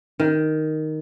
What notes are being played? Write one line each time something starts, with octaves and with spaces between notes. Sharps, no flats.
D#3